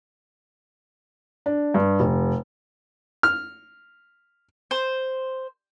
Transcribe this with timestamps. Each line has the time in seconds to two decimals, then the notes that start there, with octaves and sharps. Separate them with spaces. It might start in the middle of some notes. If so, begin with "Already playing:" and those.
1.46 D4
1.74 G2
2.00 F1
3.23 F6
4.71 C5